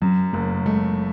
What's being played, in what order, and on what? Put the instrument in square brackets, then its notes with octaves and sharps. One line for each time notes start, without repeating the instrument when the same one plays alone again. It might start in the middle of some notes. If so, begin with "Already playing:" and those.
[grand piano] F#2 [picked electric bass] F#3
[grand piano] F#1 [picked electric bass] A3
[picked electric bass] G#3 [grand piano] A3